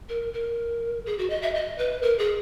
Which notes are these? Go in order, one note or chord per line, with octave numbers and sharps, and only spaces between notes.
A#4
A#4
G#4
F#4
D#5
E5
D#5
B4
A#4
G#4